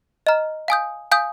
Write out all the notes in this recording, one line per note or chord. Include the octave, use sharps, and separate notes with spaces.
D#5 A#5 F6
F5 G#5 D#6 G6
F5 G#5 D#6 G6